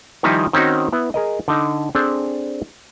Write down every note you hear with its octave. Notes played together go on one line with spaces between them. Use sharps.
D#3 F3 G3 D#4 E4 G#5
D#3 C4 C#4 D#4 F#4
B3 E4
G#4 A#4 D#5
D3 D#4
C4 D4 G#4 A4